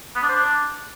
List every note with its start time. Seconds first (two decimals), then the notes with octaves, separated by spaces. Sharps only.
0.16 B3
0.22 D4
0.29 C5
0.36 D4